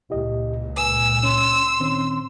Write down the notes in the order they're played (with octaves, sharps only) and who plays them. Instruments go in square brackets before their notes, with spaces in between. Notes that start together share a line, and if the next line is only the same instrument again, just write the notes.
[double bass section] C#2 A#2 [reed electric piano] E4 G4 D#5
[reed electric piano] B4 [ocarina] G#5 [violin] E6
[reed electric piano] C#4 [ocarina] C6
[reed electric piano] D#3 C4 C#4